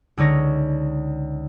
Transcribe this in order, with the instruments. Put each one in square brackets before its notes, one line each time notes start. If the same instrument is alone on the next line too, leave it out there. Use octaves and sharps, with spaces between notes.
[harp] C#2 D3 D#4 C#5 A#6